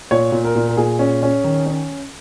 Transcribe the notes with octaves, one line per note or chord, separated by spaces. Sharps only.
A#2 C#5
A#2
A#4
A#2
A#4
A#2 G#4
C#4
C#4
D#3
C#4